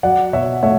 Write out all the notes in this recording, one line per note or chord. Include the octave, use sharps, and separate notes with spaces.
F#3 D5 F#5
B2 C#5 E5
A3 C#5 E5